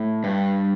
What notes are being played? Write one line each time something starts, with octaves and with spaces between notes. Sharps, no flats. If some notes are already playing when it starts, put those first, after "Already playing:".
Already playing: A2
G2